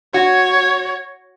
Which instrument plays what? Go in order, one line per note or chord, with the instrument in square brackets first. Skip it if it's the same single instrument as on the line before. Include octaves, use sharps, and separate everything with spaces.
[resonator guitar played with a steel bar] F#4 [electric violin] C#5